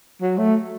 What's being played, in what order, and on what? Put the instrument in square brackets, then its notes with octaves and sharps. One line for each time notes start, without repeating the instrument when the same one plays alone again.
[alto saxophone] F#3
A3